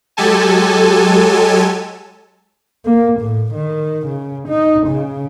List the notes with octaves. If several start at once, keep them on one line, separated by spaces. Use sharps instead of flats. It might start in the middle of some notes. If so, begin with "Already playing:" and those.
F#3 G#3 G4 A4 G#5 A5
A#3
A2
D#3
C#3
D#4
C#3